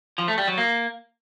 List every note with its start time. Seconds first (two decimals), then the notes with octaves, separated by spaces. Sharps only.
0.18 F3
0.28 A3
0.38 G3
0.48 F#3
0.57 A#3